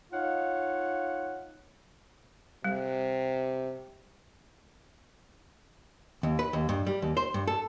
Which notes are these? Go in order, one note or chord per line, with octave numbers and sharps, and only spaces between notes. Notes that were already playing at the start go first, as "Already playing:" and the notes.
D#4 F4 C#5 F5 F#5
C3 G3
D#2
B4
D#2
G2
G3
D#2
C5
G2
A4